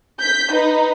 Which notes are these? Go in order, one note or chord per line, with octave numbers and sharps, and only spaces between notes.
G6 B6
D#4 B4